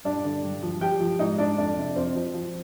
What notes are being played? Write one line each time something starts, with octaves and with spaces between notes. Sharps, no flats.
G2 D4 D5
D3
G2
F3
F3 G4 G5
F3
G#2 D#4 D#5
G#2 D4 D5
F2 D4 D5
C3
F2 C4 C5
F3
F3